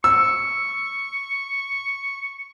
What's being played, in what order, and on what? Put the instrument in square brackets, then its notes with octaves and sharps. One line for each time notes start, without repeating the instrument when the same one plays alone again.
[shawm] C#6 [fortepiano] E6